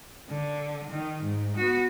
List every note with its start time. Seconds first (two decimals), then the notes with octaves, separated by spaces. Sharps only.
0.29 D3
0.89 D#3
1.22 G#2
1.56 B3 F#4